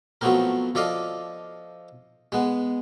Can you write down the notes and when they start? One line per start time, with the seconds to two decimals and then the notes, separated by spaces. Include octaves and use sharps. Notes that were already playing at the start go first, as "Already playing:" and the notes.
0.21 F3 F#3 A3 B3 C4 A#4
0.75 F3 A4 D5 D#5 F5
2.32 G#3 B3